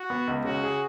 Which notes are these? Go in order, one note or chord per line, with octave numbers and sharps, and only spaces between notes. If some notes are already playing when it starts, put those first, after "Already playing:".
Already playing: F#4
B3
C#2
C#3 F#4
G#4